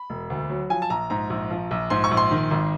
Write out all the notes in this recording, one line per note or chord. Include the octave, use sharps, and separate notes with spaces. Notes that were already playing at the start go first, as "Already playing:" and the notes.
Already playing: B5
E1
D2
F#3
F3 G#5
A5
A#1 A#5
G#2 A#5
A#1
F3
A#1
G#2 C6
C#6
A#1
C6
D#3
G#1